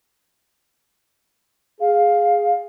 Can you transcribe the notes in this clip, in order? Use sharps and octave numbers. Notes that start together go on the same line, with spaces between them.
G#4 F5